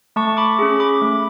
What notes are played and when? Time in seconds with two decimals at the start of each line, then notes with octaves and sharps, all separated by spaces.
0.16 A3 A5 C#6
0.37 B5 D6
0.59 C#4 G#4
0.80 B5 D6
1.01 A3